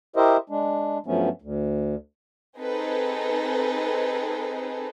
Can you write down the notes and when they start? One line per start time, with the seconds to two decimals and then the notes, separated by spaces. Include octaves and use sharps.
0.16 E4 G4 A#4 C5 D#5 E5
0.50 G#3 D4
1.06 G2 F3 F#3 A3 B3 C#4
1.42 D2
2.57 C4 D#4 G#4 A4 B4